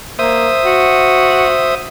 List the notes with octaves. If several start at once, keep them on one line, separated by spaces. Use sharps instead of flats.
A#3 C5 E5 D#6
F#4